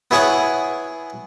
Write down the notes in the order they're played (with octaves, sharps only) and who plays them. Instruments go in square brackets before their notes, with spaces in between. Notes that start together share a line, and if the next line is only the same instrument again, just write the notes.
[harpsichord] B3 E4 G#4 C#5 F#5